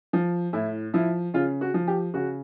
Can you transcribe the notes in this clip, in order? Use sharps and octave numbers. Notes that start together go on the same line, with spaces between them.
F3
A2 E4
F3 E4
C#3 F4
F#4
F3
G4
C#3 F#4